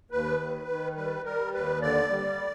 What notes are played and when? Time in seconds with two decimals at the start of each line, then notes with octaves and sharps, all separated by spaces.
0.11 D#2 B4
0.40 D#3
0.68 D#3
0.96 G3 B4
1.24 G3 A#4
1.53 D#2 B4
1.81 D3 D5
2.10 G3